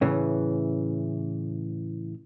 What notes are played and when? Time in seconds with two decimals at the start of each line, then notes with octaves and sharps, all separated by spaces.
0.01 A2 C#3 E3